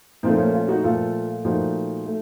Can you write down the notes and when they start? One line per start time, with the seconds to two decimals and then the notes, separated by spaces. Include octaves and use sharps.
0.23 A#2 F3 A3 C4 D#4
0.38 A#3 C#4
0.53 C#4 F4
0.68 D#4 F#4
0.84 A#2 F3 A3 F4 A4
1.45 A#2 F3 A3 D#4 F#4
2.05 A3